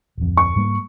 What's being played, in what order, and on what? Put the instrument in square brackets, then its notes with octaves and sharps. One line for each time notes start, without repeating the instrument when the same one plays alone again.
[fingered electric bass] D1 F2
[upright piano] C#6
[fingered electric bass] G#2 G3 A#3